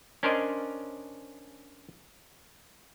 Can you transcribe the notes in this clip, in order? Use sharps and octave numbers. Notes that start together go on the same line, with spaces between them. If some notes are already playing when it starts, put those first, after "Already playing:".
C#4 D4 A#4 C5 D5 D#5